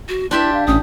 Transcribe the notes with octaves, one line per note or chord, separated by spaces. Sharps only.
F#4
D4 E4 G4 E5 C6
F5
A1 C#4 D#6